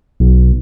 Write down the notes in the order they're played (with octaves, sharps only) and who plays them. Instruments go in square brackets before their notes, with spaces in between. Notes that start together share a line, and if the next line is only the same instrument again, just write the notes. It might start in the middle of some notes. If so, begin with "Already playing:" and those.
[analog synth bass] B1